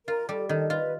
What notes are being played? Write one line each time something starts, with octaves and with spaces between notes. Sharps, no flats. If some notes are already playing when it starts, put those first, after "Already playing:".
F4 A#4
G3 A4
D#3 A4
F4 B4